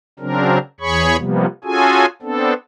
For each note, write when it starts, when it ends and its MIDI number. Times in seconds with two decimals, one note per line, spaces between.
0.19 0.58 49
0.19 0.58 54
0.19 0.58 60
0.19 0.58 62
0.19 0.58 70
0.80 1.16 40
0.80 1.16 68
0.80 1.16 73
0.80 1.16 83
0.80 1.16 85
1.18 1.46 48
1.18 1.46 53
1.18 1.46 55
1.18 1.46 58
1.18 1.46 59
1.64 2.06 61
1.64 2.06 65
1.64 2.06 66
1.64 2.06 68
1.64 2.06 69
1.64 2.06 80
2.22 2.53 59
2.22 2.53 60
2.22 2.53 62
2.22 2.53 69